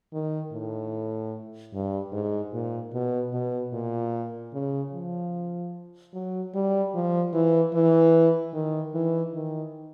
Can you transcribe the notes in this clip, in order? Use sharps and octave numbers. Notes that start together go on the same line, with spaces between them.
D#3
A2
G2
G#2
A#2
B2
B2
A#2
C#3
F3
F#3
G3
F3
E3
E3
D#3
E3
D#3